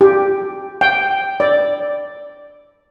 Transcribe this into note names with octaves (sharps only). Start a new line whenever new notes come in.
G4
G5
D5